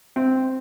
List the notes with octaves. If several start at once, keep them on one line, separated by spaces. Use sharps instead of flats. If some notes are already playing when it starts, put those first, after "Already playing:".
C4